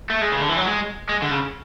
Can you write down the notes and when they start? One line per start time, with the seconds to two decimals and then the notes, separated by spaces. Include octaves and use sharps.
0.10 A3
0.22 G#3
0.32 C#3
0.40 D3
0.49 E3
0.57 F#3
0.65 G#3
1.09 G#3
1.22 D3
1.31 C#3